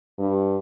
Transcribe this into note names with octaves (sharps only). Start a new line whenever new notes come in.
G2